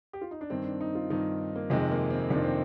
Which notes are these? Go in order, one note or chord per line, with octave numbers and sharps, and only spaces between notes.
G4
F4
D#4
D4
G2 D#3 C4
D4
D#4
F4
G2 D#3 D#4
A#3
F2 C3 D#3 G#3
A#3
C4
F2 C3 D#3 D4
C4